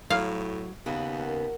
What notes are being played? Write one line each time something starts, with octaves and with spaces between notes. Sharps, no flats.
A2 F#3 F5
D#2 C#3 B3 B4
A#4 F#5